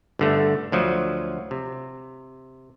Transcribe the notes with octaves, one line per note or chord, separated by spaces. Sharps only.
G1 D3 A3
D2 F3 F#3
C3